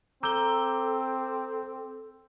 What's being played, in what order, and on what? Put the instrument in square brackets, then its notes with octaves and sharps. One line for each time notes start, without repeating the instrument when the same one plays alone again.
[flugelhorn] C4 [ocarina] A4 [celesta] A#5 G7 [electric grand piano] D6 E6 G6